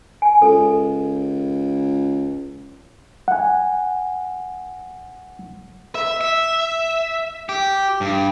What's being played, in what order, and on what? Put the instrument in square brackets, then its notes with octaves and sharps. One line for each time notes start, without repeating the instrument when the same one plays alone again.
[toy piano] G#5
[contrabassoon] C#2 [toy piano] A4
[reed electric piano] F#5 G#5
[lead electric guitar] E5
E5
G4
G2